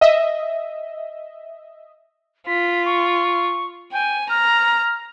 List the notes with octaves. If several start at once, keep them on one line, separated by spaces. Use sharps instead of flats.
D#5 E5
F4 B6
C#6
G5 G#5
A#5 F6